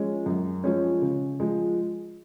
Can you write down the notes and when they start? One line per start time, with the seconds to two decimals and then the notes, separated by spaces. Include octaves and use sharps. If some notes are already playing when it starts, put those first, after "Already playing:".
Already playing: F3 G#3 C#4
0.26 F#2
0.64 F3 G#3 C#4
1.02 C#3
1.40 F3 G#3